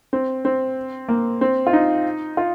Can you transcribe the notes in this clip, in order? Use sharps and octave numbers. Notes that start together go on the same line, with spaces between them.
C4
C4
A#3
C4
F4
D#4
F4